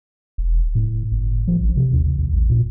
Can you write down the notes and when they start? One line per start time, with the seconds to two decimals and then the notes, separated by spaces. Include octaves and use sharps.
0.38 E1
0.75 A2
1.12 G1
1.47 F3
1.61 A1
1.77 C3
1.93 D#2
2.18 D#2
2.33 A1
2.50 A#2